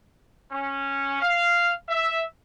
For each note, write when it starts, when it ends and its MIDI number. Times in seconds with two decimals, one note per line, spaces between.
0.52 1.20 61
1.21 1.72 77
1.89 2.23 76